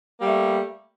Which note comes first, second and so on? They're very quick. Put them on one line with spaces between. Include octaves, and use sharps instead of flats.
A#3 G3 A3